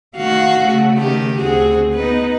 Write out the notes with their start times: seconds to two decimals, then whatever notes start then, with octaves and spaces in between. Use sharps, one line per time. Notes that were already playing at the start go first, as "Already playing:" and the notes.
0.17 D#3 A3 F#4 F5
0.60 C#3 A3
0.98 D#3 G4
1.39 D2 C4 F#4 G#4
1.95 B3 D#4 B4